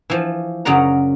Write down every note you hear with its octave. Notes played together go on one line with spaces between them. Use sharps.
E3 F3
F#2 C#3 F#3 D5 F#5 A#5